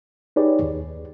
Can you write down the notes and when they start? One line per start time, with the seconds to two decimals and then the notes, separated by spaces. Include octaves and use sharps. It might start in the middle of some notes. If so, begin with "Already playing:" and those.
0.36 D#4 G4 G#4 B4 C#5 D5
0.62 D#2